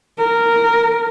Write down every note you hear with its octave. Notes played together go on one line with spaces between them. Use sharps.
A#4